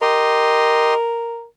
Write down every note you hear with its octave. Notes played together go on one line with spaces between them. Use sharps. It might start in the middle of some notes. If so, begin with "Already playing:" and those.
G4 A#4 D#5 C6